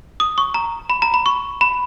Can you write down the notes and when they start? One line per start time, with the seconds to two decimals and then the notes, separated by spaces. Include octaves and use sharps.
0.20 D#6
0.38 C#6
0.54 A#5
0.90 B5
1.02 A#5
1.14 B5
1.26 C#6
1.61 B5